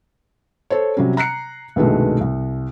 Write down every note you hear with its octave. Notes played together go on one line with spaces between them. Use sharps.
A4 C5 C#5
C3 F#3 G3 C#4
A#5 F#6 C7 C#7
C2 G2 B2 D#3 G#3 A3
C2